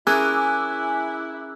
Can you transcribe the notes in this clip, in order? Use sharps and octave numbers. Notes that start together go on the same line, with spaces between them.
C#4 E4 G#4 A#4 G#5 D6 E6 F#6